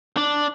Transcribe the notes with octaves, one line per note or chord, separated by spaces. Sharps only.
D4